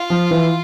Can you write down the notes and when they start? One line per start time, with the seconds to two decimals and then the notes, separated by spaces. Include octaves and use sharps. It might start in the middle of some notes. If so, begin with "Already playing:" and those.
Already playing: F4
0.10 F3
0.31 E3